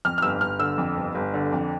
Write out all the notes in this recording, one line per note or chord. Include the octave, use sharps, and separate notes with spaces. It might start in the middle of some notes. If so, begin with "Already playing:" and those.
F2 F6
F6
G1 E6
G1 F6
D3 E6
F2
G1
G1
D3
F2